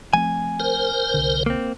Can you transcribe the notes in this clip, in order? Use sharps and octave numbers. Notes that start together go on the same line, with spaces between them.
F3 A3 C4 G#5
A#4 C5
C2 D3
A#3 C4